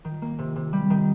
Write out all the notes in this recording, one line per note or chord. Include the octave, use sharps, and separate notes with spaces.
D#3
A#3
C3
C3
G3
D#3